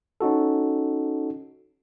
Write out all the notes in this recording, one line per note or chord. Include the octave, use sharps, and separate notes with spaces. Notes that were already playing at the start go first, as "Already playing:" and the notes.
C#4 D#4 F#4 A4